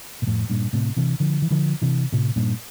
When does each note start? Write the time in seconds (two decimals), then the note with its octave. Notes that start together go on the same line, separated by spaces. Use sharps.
0.22 A#2
0.27 F2 A2
0.50 G2 A#2
0.73 A2 C3
0.97 C3 E3
1.20 D3 F3
1.42 E3
1.51 D3 F3
1.82 C3 E3
2.12 A2 C3
2.36 G2 A#2